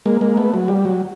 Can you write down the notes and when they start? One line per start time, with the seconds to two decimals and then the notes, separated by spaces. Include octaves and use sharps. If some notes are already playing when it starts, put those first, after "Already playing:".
0.06 G#3 A#3
0.21 G#3 A#3
0.37 A3 B3
0.54 F#3
0.68 G3
0.85 F#3